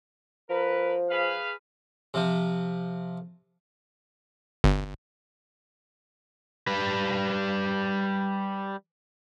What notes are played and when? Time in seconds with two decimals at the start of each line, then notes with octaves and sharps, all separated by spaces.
0.50 F3 A#4 B4
1.10 G#4 B4 F5
2.14 C3 F3
4.64 G1
6.67 G3 B4